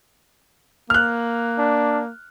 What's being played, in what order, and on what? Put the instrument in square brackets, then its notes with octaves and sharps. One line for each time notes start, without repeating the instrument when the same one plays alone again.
[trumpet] A#3 [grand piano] F6 F#6
[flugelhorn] D4